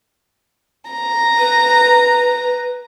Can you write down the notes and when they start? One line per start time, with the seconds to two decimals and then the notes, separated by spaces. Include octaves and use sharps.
0.91 A#5
1.38 B4